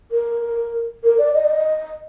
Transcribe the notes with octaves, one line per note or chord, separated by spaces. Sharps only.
A#4
A#4
D5
D#5
D5
D#5